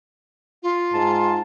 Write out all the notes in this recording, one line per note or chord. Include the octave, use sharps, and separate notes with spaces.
F4
G#2 A5